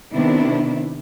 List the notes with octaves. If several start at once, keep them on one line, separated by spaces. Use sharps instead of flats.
C3 D#3 B3 D4 E4